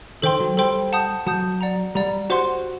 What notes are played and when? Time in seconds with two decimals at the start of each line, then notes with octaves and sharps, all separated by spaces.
0.22 D#3 A4 C5 G5 C6
0.40 F#3
0.57 G3 A4 C5 G5 C6
0.93 F#5 A5 D#6 G6
1.27 F#3 F#5 A5 D#6 G6
1.61 D5 F#5 A#5
1.95 G3 D5 F#5 A#5
2.30 F#4 G4 C5 F#5 C6